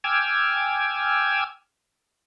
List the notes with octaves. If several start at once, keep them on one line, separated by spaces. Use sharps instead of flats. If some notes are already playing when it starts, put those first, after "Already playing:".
G5 G#5 D6 E6 F6 G#6